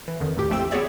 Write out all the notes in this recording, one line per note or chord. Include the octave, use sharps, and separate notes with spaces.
E3
F2 D3 D#3
D2 A2 G4
A#1 F2 A3 C4 G5 E6
B3 F#4 G#4 C#5 D5 E5